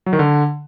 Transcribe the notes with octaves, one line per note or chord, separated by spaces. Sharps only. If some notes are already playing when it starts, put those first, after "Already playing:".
F#3
D#3
D3